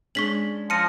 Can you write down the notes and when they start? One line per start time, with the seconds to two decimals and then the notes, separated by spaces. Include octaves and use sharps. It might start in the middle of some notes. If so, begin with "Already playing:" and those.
0.15 G#3 C#4 D4 C#6 B6 F#7
0.70 F3 A5 F6 A#6 C#7 D#7